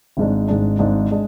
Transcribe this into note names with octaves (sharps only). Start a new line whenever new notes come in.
G#1 G#2 G#3 D4
G#1 G#2 G#3 D4
G#1 G#2 G#3 D4
G#3 D4